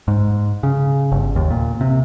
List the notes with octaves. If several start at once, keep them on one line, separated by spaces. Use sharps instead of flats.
G#2
C#3
G1
D#2
A#2
C3